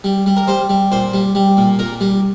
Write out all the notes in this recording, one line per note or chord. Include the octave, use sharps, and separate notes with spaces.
G3
G3
A#4
G3 C5
G3
A#2 C5
G3
G3
A#2
A#2 A#4
G3